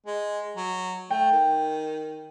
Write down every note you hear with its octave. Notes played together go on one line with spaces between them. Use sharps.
G#3
F#3
A3 G5
D#3